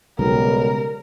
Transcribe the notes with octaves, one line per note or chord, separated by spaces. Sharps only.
B1 C#3 G3 G#3 B3 A#4